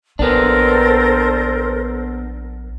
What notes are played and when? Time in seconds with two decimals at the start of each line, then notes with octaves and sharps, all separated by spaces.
0.19 A#1 B3 D4 A4 A#4 C5